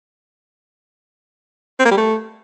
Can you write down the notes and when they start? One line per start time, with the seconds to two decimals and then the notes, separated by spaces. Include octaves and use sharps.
1.80 C4
1.85 A#3
1.91 G3
1.97 A3